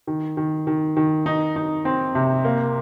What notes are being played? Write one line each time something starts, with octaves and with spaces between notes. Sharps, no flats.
D#3
D#3
D#3
D#3
D#4
D#4
C4
C3
A#3